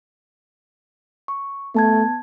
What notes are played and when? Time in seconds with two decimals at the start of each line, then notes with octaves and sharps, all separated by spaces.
1.28 C#6
1.74 A3 B3 A5 G#6